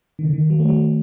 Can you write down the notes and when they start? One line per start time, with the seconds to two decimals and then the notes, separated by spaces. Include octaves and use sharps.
0.19 D#3
0.24 C#3
0.33 D#3
0.50 F#3
0.60 A3
0.69 F#3